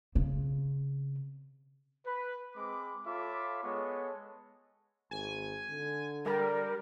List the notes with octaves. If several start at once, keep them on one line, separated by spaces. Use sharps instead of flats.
C#3 C4
B4
G#3 C4 B5 D6
F4 A4 C#5 E5 B5 D6
G#3 B3 A4 C#5
G#1 G#5
D3
G3 A#4